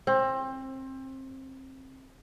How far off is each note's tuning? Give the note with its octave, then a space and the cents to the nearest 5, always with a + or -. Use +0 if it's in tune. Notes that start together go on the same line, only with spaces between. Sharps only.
C4 +25